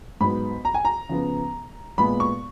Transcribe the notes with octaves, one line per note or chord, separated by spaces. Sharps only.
G#2 F#3 B3 B5
A#5
G#5
A#5
C#3 F3 B3
A#2 G#3 B3 B5
C#6